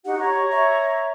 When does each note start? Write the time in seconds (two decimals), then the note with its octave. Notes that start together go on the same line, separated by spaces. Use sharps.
0.05 D#4 F#4 G4 F#5
0.18 C#5 A#5 C#6
0.51 E5